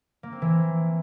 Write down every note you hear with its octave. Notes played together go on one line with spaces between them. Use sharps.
A#3
C4
E3